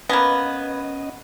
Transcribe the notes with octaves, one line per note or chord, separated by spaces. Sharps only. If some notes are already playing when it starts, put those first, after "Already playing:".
A#3 B3 C#4 B4 D#5 B5 G#6